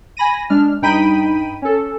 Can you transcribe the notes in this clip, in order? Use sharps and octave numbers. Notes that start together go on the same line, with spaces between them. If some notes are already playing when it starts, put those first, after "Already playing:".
G#5 B5 A#6 D#7
G#3 D4 F6
G2 D#4 G5 B5 B6 D#7
C#4 A4